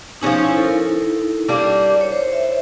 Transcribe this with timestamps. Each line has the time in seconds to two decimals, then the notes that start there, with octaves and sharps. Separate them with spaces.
0.22 F3 G#3 C#4 D#4
0.44 E4
0.57 A4
0.65 A#4
1.49 G3 A#3 D4
2.01 C#5
2.12 C5
2.33 E5